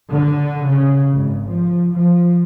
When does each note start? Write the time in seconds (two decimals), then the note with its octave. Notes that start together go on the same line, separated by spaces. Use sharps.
0.10 D3
0.65 C#3
1.12 G#1
1.49 F3
1.93 F3